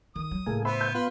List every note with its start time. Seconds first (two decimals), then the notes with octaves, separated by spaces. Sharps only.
0.15 D#3 D#6
0.31 F#3
0.46 A2 C#3 A3 A#3 G#4
0.65 B3 C5 E5 B5
0.81 G6
0.95 B3 F4 B4 C6